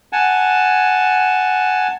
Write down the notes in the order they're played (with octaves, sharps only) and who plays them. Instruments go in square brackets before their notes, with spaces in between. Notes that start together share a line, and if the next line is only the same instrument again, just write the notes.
[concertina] F#5 G#5 A5